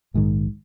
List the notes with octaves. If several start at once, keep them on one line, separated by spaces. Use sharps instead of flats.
A#1 G#2 D#3